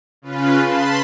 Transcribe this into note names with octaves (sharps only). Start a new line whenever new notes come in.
C#3 F4 B4
A5 B5 C6